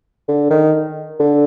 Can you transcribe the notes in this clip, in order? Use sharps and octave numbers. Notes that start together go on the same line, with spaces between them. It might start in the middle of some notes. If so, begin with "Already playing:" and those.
D3
D#3
D3